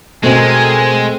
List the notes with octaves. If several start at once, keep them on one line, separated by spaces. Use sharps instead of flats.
B2 G#3 A3 C4 A#4 G#5